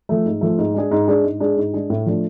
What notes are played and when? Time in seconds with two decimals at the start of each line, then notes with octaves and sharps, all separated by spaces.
0.09 F3 A3
0.26 G#2
0.41 F3 A3
0.58 G#2
0.74 G#3 D4 G#4
0.91 G#2
1.08 G#3 D4 G#4
1.24 G#2
1.40 G#3 D4 G#4
1.57 G#2
1.73 G#3 D4 G#4
1.90 A2
2.06 F3 A3 D4